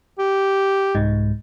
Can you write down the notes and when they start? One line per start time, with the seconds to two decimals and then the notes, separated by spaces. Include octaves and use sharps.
0.18 G4
0.95 C2 G#2